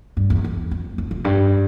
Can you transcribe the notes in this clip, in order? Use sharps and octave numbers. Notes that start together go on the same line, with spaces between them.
G2
E2
E2
F2
F2
F2
G2